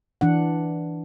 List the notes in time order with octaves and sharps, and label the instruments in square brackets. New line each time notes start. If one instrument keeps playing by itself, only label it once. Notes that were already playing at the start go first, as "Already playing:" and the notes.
[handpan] E3 D4 F#5